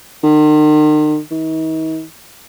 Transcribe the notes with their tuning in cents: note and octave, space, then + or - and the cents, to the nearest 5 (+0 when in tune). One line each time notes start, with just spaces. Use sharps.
D#3 -40
D#3 +45